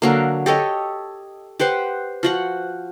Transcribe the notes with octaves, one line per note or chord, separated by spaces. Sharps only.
D3 F#3 A#3
G4 A4 C#5 D#5
G4 B4 C5 F#5
F3 F#4 F#5